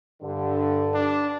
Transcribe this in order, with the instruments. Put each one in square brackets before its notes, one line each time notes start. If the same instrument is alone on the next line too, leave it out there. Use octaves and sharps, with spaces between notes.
[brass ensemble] G2 D3
[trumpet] D4